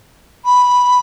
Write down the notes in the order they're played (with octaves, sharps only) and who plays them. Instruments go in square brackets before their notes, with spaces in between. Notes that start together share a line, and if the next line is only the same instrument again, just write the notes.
[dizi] B5